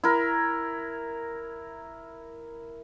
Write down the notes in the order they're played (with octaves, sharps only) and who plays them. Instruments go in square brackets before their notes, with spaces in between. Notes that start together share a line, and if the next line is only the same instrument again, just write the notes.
[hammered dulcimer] E4 A#4